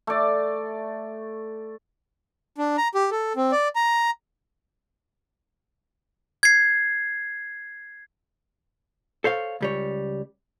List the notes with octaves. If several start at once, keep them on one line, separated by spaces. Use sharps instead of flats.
A3 D5
D4
A#5
G4
A4
C4
D5
A#5
G#6 C7
A4 C5 C#5 F5
C#2 G3 C#5